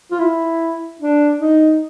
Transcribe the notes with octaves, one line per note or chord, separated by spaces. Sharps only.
F4
E4
D4
D#4